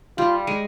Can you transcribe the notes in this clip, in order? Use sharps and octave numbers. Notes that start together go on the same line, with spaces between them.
G3 F4
G#3